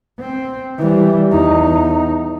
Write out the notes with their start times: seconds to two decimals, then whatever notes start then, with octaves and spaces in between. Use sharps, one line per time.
0.20 C4
0.78 E3 G3
1.30 E2 D#4